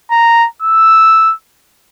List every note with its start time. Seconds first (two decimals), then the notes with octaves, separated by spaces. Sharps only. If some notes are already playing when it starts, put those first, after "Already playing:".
0.11 A#5
0.62 E6